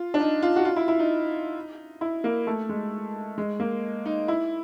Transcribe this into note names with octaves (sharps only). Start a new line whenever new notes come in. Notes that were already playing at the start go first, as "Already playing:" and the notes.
Already playing: F4
D4
D#4
F4
F#4
F4
E4
E4
D#4
E4
A#3
A3
G#3
G#3
A#3
D#4
E4